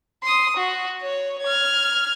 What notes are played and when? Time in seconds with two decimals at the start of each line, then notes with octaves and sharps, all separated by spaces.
0.23 C6 D#6
0.57 F#4
1.02 C#5
1.43 F6 G#6